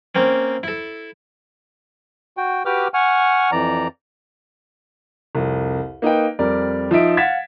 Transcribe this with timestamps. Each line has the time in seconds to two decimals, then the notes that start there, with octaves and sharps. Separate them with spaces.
0.15 A#3 C4 C#4
0.63 E4 A4
2.37 F#4 G5
2.65 F#4 G4 B4 G5 D6 F6
2.94 F#5 G#5 C#6 F6
3.52 F2 E3 D5 A#5
5.35 C2 F2
6.02 A#3 D#4 B4 G5
6.39 F2 G3 A#4 D5
6.91 F3 D#4 E5 D7
7.17 F5 F#5 G#6 A6 B6 E7